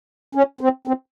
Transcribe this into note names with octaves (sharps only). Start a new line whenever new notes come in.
C#4
C4
C4